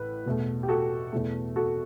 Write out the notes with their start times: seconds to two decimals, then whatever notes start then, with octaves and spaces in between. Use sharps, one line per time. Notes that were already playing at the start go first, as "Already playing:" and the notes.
Already playing: A1 A2 B4
0.26 E2 B2 A3
0.63 G4
0.68 F#4 A4
1.12 E2 B2 A3
1.56 F#4 A4